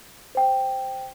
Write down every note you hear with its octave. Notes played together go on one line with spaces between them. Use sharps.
C5 G5